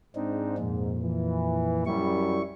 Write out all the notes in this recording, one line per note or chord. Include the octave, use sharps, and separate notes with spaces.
G#2 C4 D4 D#4
F2 A#2
E3
F#2 G3 E4 C#6